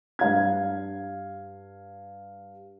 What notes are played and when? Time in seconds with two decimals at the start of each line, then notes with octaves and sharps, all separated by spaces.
0.19 G2 F5 G#6